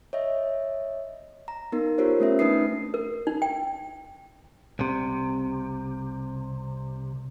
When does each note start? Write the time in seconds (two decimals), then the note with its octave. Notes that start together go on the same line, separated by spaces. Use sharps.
0.13 C#5 D#5 E5
1.48 A#5
1.72 B3 D#4 A#4
1.98 F4 G4 A#4 C5 C#5
2.20 A3 C#4 E5
2.39 A3 D4 D#4 B4 D#6 C7
2.94 A#4
3.27 D#4
3.42 G5
4.79 C2 C3